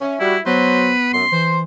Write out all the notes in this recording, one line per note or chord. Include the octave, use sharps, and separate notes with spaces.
C#4 E5
G3 E4 F#4
F#3 B3 B4 C5
F#2 C6
E3 C5